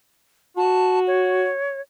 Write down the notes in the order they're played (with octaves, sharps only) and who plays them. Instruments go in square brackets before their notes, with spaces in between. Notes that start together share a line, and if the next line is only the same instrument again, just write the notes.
[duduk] F#4 [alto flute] A5
[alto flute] C#5